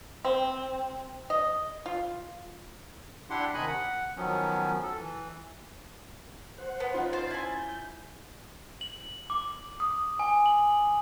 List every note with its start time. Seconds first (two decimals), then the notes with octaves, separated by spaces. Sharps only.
0.25 C4
1.30 D#5
1.86 F4
3.30 D4 E4 G4 F#5 C6
3.54 C3 D#3 D#5 G#5 B5 F#6
3.68 F#5
4.17 D#3 F3 F#3 B3 C#4
4.83 A4
4.97 E3
6.58 C5 F#5
6.80 B3
6.94 C#4 D#4 F4
7.13 C5 A6
7.31 E4 G#5
7.57 G6
8.81 F#7
9.30 D6
9.80 D#6
10.19 G#5
10.46 F#7